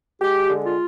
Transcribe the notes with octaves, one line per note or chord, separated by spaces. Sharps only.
G#3 G4
D3
F4